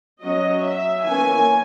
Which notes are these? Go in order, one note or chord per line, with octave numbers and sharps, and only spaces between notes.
F#3 C#4 D#5
E5
E3 A#3 C#4 G#5